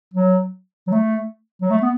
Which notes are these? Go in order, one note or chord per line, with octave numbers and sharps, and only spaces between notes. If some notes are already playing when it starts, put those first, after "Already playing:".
F#3
F#3
A3
F#3
A3
B3